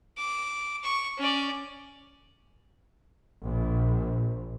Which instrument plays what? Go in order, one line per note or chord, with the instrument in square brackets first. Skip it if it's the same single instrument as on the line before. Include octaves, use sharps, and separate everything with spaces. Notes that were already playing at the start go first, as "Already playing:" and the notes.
[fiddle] D6
C#6
C#4 D5
[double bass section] A#1